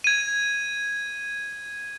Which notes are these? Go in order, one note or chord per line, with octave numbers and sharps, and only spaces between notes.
G#6 D#7